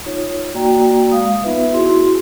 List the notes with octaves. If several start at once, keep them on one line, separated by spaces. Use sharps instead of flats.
D#4 F4 C#5
A#3 F#4 D5 G5 A#5
G#3 F5 D#6
B3 D#4 F4 B4 E5
E4 F#4 G#4 C6